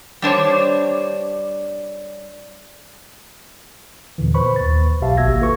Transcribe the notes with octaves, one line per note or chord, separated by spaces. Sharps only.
G3 D4 C5 C#5
E2 A#2 D3 E3
B4 C5 B5 C#6
D#2 A6
B1 B2 G4 E5 F5 A5
G#1 A#3 F#4 E6 G#6 A#6
F4 A4 B4 C#6